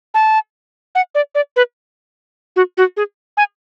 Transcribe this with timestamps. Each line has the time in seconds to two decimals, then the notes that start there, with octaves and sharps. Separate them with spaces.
0.14 A5
0.95 F#5
1.15 D5
1.35 D5
1.56 B4
2.56 F#4
2.77 F#4
2.97 G#4
3.37 G#5